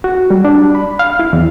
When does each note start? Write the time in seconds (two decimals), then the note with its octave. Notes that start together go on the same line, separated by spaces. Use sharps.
0.04 F#4
0.30 G3
0.45 D4
0.75 B5
0.99 F5
1.19 E4
1.33 E2